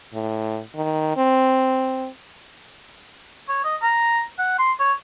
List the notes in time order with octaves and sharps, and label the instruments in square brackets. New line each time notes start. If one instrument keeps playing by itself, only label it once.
[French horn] A2
D#3
C4
[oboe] C#5
D#5
A#5
F#5
C6
C#5